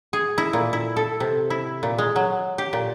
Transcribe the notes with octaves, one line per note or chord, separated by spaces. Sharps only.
G#4
E4
A#2
E4
A4
C3
E4
A#2
G#3
F#3
G4
A#2